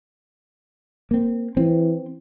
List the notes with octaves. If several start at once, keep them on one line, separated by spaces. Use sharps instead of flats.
A#3 C4
E3 C4